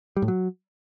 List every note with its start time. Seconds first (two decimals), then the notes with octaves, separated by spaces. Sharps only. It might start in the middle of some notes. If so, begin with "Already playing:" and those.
0.17 G3
0.22 A2
0.28 F#3